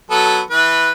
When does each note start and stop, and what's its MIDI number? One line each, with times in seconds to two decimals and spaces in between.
0.11 0.41 54
0.11 0.41 59
0.11 0.41 69
0.50 0.91 52
0.50 0.91 71